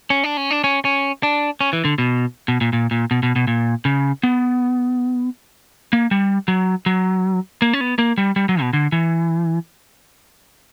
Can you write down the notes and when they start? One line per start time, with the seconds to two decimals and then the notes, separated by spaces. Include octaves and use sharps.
0.10 C#4
0.24 D4
0.37 C#4
0.51 D4
0.64 C#4
0.85 C#4
1.23 D4
1.61 C#4
1.73 E3
1.85 D3
1.98 B2
2.48 B2
2.61 A#2
2.73 A#2
2.91 A#2
3.11 B2
3.23 B2
3.36 B2
3.47 A#2
3.85 C#3
4.23 B3
5.93 A#3
6.11 G3
6.48 F#3
6.86 F#3
7.62 A#3
7.73 C#4
7.81 B3
7.99 A#3
8.18 G3
8.36 G3
8.49 F#3
8.61 B2
8.73 D3
8.92 E3